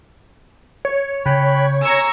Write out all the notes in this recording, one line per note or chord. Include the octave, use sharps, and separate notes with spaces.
C#5
C#3 G5 B5 F#6
G#5 A#5 C#6 E6